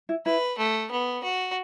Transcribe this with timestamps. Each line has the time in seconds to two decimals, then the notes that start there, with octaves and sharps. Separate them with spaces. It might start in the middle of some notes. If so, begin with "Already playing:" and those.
0.09 E4
0.26 E4 B4
0.58 A3
0.91 B3
1.24 F#4